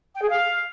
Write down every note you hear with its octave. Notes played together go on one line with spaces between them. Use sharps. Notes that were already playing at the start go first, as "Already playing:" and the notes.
G5
G#4
F5